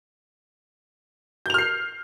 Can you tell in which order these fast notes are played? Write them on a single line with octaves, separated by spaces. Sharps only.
G6 F7 F6 C7